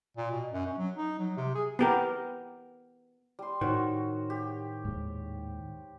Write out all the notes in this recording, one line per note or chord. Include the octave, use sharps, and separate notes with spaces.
A#2
B2
F#2
C#4
F#3
D#4
F#3
C3
G#4
B3 G4 A#4
G3 C6
A2 D#3 F#4 C5 C#5
G4
D#2 G#2